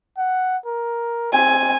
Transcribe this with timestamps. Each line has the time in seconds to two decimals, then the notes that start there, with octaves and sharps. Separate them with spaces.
0.18 F#5
0.66 A#4
1.33 C4 G#5